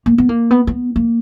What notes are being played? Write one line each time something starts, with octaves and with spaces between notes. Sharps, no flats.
A#3
B3
A#3
B3
B3
A#3